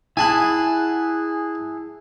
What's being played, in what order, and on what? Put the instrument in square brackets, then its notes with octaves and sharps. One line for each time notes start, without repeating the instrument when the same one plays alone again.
[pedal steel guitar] E4 G#4 F#5 [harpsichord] G#5 A5 B5